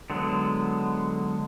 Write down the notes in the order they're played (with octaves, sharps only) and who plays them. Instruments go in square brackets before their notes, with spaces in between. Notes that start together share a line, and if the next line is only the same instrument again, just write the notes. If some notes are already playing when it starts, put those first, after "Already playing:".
[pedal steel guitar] D3 F#3 G#3 B3